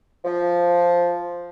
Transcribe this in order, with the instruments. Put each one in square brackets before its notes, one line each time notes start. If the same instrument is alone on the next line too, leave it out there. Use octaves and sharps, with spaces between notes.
[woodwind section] F3